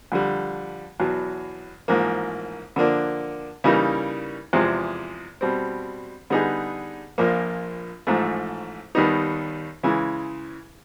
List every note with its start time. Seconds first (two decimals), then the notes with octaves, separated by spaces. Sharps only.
0.12 F2 D3 G3
1.00 E2 B2 F#3
1.88 A1 G#2 F3 A#3
2.76 D3 F3 A#3 D4
3.64 C#3 E3 G3 A#3 D#4
4.53 E2 C3 F3 G#3
5.41 B2 G3 C4
6.30 D3 G3 B3 D#4 G#4
7.18 A#1 A#2 F3 A#3
8.07 A1 G#2 F3 A3
8.95 D#2 D#3 G3 B3 D#4
9.83 C#3 E3 G#3